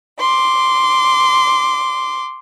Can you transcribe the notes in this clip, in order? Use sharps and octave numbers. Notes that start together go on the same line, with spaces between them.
C6 D6